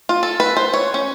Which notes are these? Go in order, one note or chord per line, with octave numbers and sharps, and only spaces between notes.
F4
A4
B4
C5
C#5
C#4